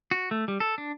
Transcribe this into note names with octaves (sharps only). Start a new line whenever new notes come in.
F#4
A3
G3
A4
D4